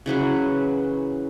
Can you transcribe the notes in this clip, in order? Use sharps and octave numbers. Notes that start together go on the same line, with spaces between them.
C#3 E3 F#3 B4